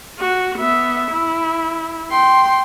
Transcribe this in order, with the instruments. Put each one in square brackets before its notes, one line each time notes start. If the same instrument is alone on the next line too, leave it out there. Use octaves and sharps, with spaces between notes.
[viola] F#4
B3 E5
E4
G5 C6